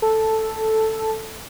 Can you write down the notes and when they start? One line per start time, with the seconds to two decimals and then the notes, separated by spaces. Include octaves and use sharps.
0.02 A4